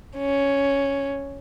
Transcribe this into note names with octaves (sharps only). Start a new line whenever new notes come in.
C#4